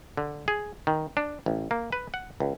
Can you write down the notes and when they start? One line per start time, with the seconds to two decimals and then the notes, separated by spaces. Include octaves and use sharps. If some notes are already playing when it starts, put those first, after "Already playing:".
0.17 D3
0.48 G#4
0.87 D#3
1.17 D4
1.46 A1
1.71 A#3
1.92 B4
2.14 F#5
2.40 C#2